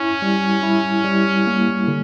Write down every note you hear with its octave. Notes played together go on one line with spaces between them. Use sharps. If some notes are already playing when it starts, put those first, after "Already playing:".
Already playing: C#4 E4
G3
E4
G3
A#3
D3